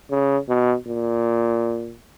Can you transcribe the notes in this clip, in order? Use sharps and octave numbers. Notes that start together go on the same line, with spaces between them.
C#3
B2
A#2